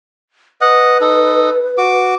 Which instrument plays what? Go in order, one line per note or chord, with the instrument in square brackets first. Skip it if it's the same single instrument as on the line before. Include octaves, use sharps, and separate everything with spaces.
[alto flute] B4 [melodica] D#5 F#5
[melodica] D#4 A4
F#4 D6